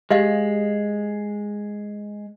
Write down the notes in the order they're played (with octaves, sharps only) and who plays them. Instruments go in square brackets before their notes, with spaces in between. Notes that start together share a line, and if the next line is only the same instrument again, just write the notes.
[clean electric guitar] G#3 [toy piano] G4 D#5 F5